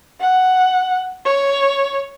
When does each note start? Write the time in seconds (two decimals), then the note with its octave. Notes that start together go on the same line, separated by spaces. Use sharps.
0.21 F#5
1.26 C#5